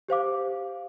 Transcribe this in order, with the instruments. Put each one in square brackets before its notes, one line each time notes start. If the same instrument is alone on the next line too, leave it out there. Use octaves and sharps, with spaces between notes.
[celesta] G4 C5 F5 D6